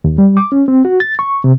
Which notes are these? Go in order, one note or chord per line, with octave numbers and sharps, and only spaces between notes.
D#2
G3
D6
C#4
C4
F#4
A6
C#6
C3